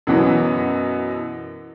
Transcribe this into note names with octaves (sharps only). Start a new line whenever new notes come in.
F#2 B2 E3 F#3